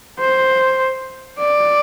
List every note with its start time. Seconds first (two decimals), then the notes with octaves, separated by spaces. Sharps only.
0.19 C5
1.39 D5